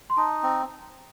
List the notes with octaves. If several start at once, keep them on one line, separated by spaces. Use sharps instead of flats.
C6
D#4 A5
C4